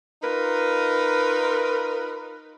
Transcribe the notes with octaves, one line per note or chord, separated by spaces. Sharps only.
D#4 F4 A#4 B4